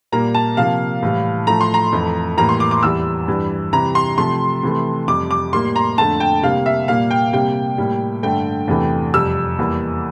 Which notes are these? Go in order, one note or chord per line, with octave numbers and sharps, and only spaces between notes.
A#2 G3 A#3 A#5
A5
C3 F3 A#3 F5
A2 E3 G3
A2 F3 A3 A#5
C6
A#5
F2 E3 A3
A2 E3 G3 A#3 A#5
C6
D6
D6
E2 E3 G3 E6
G2 E3 G3
C3 E3 G3 A#5
C6
C3 F3 A3 C6
C3 E3 A3
F2 C3 G3 D6
D6
A2 G3 A#3 C6
A#5
F2 D3 A3 A5
G5
C3 G3 A#3 F5
E5
A#2 G3 A#3 F5
G5
C3 G3 A#3 G5
A2 G3 A#3
G2 D3 A3 G5
E2 C3 E3 A3
F2 C3 G3 E6
E2 E3 G3 A#3